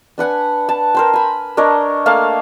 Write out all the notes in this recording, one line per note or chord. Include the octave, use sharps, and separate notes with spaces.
D4 B4 F#5 G#5
A5
A#4 C5 G5
G#5 B5
D4 A#4 C#5 D#5
A3 A#3 A4 F5